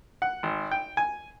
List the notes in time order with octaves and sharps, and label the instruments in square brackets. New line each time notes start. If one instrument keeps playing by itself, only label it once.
[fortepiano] F#5
G#1
G5
G#5